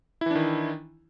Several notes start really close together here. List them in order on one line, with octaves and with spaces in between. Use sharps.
E4 E3 D4 D#3